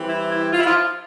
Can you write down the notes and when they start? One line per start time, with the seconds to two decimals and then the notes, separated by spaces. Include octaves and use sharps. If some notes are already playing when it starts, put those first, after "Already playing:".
Already playing: E3 G3 C4
0.09 E4
0.31 E4
0.52 F4
0.59 E4
0.65 F3 F4